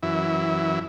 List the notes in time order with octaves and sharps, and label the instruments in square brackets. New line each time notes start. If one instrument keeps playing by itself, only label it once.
[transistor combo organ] F#2 E3 E4